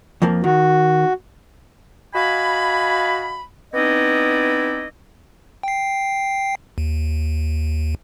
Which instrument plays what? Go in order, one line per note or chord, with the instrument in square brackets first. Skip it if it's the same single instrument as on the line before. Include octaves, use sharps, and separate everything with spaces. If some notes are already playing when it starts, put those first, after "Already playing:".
[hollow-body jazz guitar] F2 F3 A#3
[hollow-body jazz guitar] D#3 [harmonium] F#4
[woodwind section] F#4 D#5 F5 G#5 B5
B3 C4 D#4 E4 D5 D#5
[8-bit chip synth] G5 C7
D#2